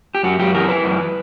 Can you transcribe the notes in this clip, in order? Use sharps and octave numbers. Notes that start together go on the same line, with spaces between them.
G4
F#2 F#4
F#2 G4
E3 A#4
E3 B4
F#2